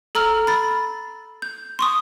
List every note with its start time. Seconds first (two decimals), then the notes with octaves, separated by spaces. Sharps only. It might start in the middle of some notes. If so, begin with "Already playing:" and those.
0.15 A4 A#5 E6 F6
0.47 B5 A6
1.42 G6
1.79 C6 C#6 D#6